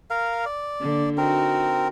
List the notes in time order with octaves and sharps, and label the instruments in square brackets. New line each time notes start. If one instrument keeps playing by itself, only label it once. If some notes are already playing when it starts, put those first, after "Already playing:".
[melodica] A#4 F5
D5
[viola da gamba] D3 A#3 D4
[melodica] C4 A#4 [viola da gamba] D#4 F#4